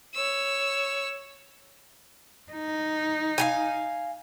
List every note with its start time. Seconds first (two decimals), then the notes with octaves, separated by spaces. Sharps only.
0.15 C#5 E6
2.52 D#4
3.38 F5 G5 G#5